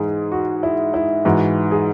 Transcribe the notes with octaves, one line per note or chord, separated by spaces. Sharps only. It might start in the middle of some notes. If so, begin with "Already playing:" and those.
Already playing: G#2 E3 G#4
F#4
E4
E4
G#2 E3 F#4
G#4